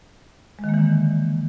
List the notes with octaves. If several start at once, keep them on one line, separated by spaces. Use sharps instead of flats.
G#3
D#3
A#3
E3
D3